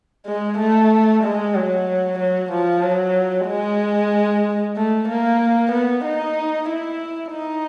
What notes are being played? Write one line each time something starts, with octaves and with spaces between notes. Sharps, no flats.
G#3
A3
G#3
F#3
F#3
F3
F#3
G#3
A3
A#3
B3
D#4
E4
D#4